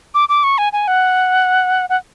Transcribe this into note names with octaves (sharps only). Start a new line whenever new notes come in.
D6
D6
C#6
G#5
G#5
F#5
F#5